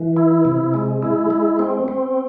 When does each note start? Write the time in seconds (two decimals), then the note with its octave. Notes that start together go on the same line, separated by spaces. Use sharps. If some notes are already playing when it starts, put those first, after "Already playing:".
Already playing: E3
0.17 E4
0.45 C3
0.74 G#3
1.03 E4
1.30 G#3
1.59 C4
1.88 C4